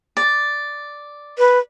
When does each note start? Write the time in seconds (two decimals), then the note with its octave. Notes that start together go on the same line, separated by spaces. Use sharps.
0.17 D5
1.38 B4